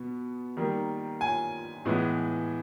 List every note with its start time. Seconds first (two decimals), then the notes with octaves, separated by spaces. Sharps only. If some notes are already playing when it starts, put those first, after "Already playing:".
Already playing: B2 B3
0.57 D#3 G3 A#3
1.21 G#5
1.85 A2 E3 G#3 B3